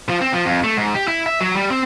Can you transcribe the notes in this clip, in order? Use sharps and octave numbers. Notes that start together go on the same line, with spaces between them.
F3
C4
F3
F2
A3
G#2
G4
E4
E5
F#3
G3
C4